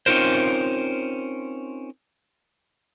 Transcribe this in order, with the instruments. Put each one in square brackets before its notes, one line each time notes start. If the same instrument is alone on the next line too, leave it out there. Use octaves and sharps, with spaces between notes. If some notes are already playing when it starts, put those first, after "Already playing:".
[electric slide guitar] C4 C#4 D#4 F4 A#4 C5